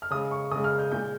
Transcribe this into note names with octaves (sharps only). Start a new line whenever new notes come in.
F6
C#3 G#3 D#6
C#6
C#3 G#3 D#6
F6
G6
A#2 G#3 G6